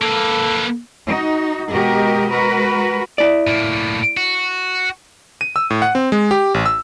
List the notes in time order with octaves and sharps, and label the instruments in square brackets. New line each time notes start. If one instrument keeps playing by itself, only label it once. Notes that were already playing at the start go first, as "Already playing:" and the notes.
[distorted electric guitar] A#3 B4 [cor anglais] A4
[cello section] D#4 F#4
B2 G#3 F#4 G4 A#4 D#5
G#3 F#4 A#4 B4
[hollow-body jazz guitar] E4 D5
[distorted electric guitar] A2 A#3
F#4
[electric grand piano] D#7
E6
A2
F#5
C4
G#3
G4
A1
E6